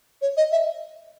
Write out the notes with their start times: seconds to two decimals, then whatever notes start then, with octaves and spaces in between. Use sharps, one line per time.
0.22 C#5
0.37 D#5
0.52 E5